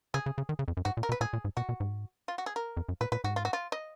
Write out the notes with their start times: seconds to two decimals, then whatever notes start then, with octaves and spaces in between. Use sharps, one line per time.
0.14 C#3 G#4
0.26 C#3
0.38 C#3
0.49 D#3
0.59 C#3
0.68 F2
0.77 F#2
0.85 G#2 F#4
0.97 A#2
1.03 A#4
1.09 B2
1.12 B4
1.21 A#2 G#4
1.33 A#2
1.45 G#2
1.57 B2 F#4
1.69 B2
1.80 G#2
2.28 F4
2.38 F#4
2.46 G#4
2.56 A#4
2.77 F2
2.89 F#2
3.01 A#2 B4
3.12 A#2 B4
3.24 G#2 F#4
3.36 F4
3.45 F#4
3.53 F4
3.72 D#5